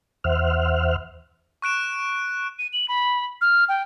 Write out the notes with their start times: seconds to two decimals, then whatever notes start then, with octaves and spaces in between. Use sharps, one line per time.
0.24 E2 C5 E5 F#5 F6
1.62 C#6 F#6 D7 E7
2.59 D#7
2.73 F#7
2.89 B5
3.41 F6
3.69 G5